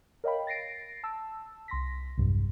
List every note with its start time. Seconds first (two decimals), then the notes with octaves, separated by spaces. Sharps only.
0.24 A#4 C#5 D#5 F5 G5 B5
0.47 A6 A#6 C7 D7
1.03 A5 E6
1.68 C2 C6 A#6 B6
2.17 B1 E2 G2 C3